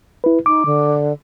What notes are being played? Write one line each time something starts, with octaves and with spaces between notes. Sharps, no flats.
E4 B4
D#4 D6
D3